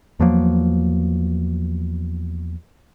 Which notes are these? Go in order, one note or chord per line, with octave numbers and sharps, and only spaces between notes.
E2 F3 F#3 A#3